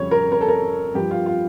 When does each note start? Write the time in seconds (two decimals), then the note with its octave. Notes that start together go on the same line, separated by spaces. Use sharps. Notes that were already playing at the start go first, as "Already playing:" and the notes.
Already playing: F2 C#3 G3 C#5
0.11 A#4
0.32 A#4
0.41 A4
0.48 A#4
0.94 G2 F3 G4
1.11 F4
1.26 F4